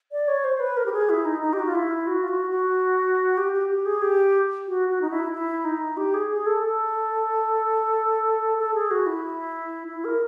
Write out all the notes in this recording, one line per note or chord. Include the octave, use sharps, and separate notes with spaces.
D5
C#5
C5
B4
A#4
G4
G#4
E4
D#4
D#4
G4
F#4
F4
E4
F#4
F4
F#4
F#4
G4
G4
G4
G#4
G4
F#4
F#4
D#4
E4
E4
D#4
G4
G#4
G#4
A4
A4
A4
G#4
F#4
E4
E4
A#4